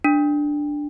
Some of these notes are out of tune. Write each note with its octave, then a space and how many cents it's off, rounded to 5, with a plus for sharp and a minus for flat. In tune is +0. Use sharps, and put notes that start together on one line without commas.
D4 +0